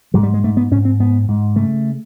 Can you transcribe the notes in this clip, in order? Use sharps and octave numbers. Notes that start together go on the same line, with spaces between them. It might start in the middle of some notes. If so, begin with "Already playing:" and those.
G#2 F#3
G3
G#3
G#2 A3
B3
G#2 C#4
C4
G#2 B3
G#2
C#3 A3